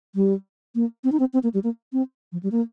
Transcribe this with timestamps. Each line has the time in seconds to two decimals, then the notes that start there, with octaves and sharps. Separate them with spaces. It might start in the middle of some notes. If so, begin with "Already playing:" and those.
0.15 G3
0.75 A#3
1.04 C4
1.12 D#4
1.20 C4
1.33 C4
1.43 A#3
1.54 G3
1.64 A#3
1.93 C4
2.32 F3
2.43 G3
2.52 A#3